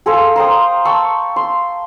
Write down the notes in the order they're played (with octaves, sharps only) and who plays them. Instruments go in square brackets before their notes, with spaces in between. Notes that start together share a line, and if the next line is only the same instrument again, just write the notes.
[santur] G#4 A4 C5 F5
A#4 C5 G5 D#6
A5 C#6 E6
C6